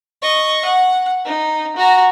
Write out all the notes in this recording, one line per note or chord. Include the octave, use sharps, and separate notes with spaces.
D#5 C#6
F#5
D#4
F#4 A#5